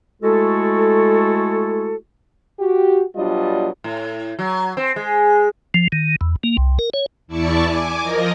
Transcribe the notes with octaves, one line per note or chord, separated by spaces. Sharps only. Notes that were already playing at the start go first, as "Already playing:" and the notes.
G#3 A3 E4 F#4 A4
F#4 G4
B2 F#3 G3 D4 F4 D#5
A2
F#3
C4
G#3
F3
D#3
E2
A#3
C2
A#4
C#5
E2 E4 D5 A5 C#6 C#7
G#5 D6
F3 A#4 D#5 A#6